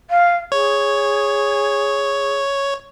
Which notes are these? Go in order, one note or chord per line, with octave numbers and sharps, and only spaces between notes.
F5
G#4 C#5